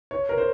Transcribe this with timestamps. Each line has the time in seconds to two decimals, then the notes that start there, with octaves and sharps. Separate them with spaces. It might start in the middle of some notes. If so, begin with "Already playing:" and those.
0.11 C#5
0.29 A#4
0.38 C5